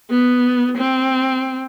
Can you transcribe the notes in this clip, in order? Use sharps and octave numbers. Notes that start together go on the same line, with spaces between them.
B3
C4